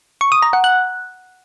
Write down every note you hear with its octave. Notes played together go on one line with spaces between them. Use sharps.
C#6
D#6
A#5
F#5
F#6